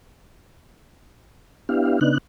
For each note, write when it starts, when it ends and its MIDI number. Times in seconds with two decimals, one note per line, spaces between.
1.69 1.99 59
1.69 1.99 62
1.69 1.99 64
1.69 1.99 67
1.69 1.99 77
2.01 2.18 49
2.01 2.18 59
2.01 2.18 62
2.01 2.18 63
2.01 2.18 90